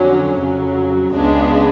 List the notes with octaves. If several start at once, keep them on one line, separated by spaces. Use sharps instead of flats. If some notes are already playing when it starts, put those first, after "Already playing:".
Already playing: F2 D3 F#3 C#4
F2 C#3 F#3
C#2 C#3 G#3 B3 D4